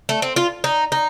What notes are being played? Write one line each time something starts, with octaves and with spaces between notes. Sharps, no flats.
A3
C4
F4
D#4
D#4